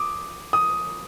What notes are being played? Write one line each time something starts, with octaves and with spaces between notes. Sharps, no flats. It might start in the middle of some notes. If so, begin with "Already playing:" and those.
Already playing: D6 D#6
D#6